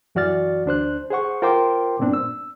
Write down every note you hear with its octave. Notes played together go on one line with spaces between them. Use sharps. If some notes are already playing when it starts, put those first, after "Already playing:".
F#2 E3 F#4 D5 F6 A6
D2 D4 C5 F#6
G#4 C5 F#5 C#6
F4 A#4 C5 G5 C6 D6
G2 A#2 B3 C4 D4
E6